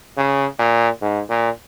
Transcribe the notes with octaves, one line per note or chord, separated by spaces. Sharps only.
C#3
A#2
G#2
A#2